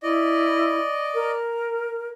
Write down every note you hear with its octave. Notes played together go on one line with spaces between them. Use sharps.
E4 D5 D#5
A#4